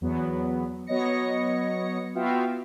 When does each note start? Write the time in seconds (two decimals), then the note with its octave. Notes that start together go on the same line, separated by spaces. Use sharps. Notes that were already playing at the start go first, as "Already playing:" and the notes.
0.01 E2 F#3 B3
0.87 F#3 B3 C#5 D#5 A#6 C#7
2.15 B3 F4 F#4 E5 F5 G5